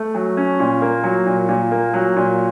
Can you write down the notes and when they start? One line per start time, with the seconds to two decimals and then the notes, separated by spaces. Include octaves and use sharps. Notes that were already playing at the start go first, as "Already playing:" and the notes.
Already playing: A3
0.15 F#3
0.37 C#4
0.60 A#2
0.82 A#3
1.04 F#3
1.26 A#2
1.49 A#2
1.71 A#3
1.94 F#3
2.16 A#2